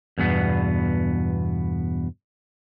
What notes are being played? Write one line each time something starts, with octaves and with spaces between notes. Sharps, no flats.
E2 G2 B2 B3